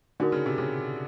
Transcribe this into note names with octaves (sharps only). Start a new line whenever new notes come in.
D3 D#4 F#4 A#4
C#3
C3
C#3